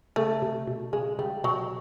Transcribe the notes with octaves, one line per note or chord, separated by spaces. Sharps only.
C#3 A3
C3
B2
C#3 G#3
C#3 G3
B2 F#3